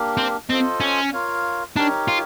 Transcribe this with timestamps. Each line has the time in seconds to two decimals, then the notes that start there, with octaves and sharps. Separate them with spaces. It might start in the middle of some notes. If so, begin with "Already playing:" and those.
Already playing: A#3 D4 G4 A#4
0.17 C4
0.49 C4 F4 A4 C5 D#5
0.81 C#4
1.12 F4 A#4 C#5 F5
1.76 D4 D#4 G4 A#4 C#5
2.08 F4